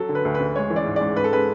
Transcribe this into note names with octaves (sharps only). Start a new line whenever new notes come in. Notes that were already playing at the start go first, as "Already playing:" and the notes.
Already playing: F#3 A4
D3
B4
D2
B4
D2
G#3 C#5
E3
D5
G#2
G#2 D5
G#2 B4
A4
G#3 B4